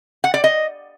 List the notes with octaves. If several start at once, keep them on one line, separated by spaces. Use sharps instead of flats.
F#5
D5
D#5